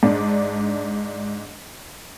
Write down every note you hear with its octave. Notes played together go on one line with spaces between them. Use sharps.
G#2 D4